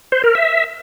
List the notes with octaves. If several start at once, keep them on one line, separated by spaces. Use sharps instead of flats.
C5
A#4
E5